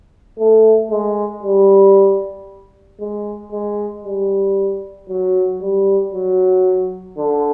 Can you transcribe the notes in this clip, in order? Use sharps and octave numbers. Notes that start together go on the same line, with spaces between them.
A3
G#3
G3
G#3
G#3
G3
F#3
G3
F#3
D3